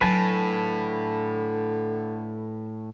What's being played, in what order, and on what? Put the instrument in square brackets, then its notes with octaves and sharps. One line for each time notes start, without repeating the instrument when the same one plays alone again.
[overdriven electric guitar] A2 [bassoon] D3 [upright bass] F#3 D#4 [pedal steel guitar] B4 G#5 A5